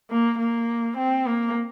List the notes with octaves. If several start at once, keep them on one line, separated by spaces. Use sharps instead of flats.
A#3
A#3
C4
A#3